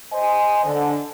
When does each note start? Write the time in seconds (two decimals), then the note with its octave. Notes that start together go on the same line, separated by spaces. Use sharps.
0.12 C5 D#5 G#5
0.65 D3